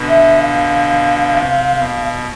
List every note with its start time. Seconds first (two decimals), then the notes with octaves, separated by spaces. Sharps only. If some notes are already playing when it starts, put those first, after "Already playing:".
Already playing: B2 D3
0.08 E5
0.39 F5
1.32 C3
1.78 B2